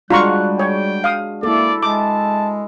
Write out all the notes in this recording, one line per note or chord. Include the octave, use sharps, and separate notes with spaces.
G3 G#3 D4 F4 F#4 A#5 C#6 F#6
C#5 G5
F5 D#6
A#3 E4 A4 D5
G#3 A5 D6